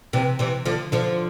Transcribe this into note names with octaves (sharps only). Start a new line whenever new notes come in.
C3 E3
C3 E3
D3 F3
D3 F3